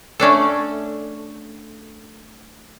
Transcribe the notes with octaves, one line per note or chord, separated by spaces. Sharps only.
A3 C#4 D4 A4